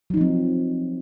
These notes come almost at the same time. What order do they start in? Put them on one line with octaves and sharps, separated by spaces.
F#3 D#4 F3 C4